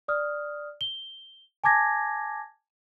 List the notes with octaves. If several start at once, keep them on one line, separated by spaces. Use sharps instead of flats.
D5 D#6 F6
G7
G#5 A5 D6 G#6 A#6